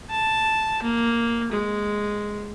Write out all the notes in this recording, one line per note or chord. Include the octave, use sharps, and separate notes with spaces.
A5
A#3
G#3